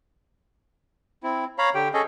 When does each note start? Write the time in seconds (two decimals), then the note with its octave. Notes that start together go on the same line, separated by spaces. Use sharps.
1.23 C4 E4
1.58 C#5 F5 A#5 B5
1.75 D3 G4 G5
1.94 C#4 G#4 A4 D#5